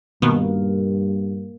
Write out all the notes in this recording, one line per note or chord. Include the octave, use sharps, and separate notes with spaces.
G2 B2 D#3 A#3 B3